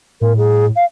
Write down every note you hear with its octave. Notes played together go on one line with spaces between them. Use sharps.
A2 A#4
G#4
F5